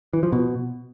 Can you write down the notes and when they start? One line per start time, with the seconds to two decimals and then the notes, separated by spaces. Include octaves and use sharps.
0.13 E3
0.23 F3
0.32 B2